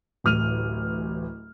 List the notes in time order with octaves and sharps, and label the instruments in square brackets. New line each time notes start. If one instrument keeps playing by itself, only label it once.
[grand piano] D1 A1 F6 D#7 F7